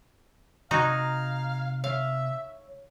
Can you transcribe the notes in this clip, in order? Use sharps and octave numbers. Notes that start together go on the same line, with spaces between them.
C3 D#4 F#4 F5 A#5 G#6
C#5 E5 F5